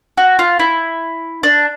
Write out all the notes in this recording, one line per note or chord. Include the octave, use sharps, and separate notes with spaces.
F#4
F4
E4
D4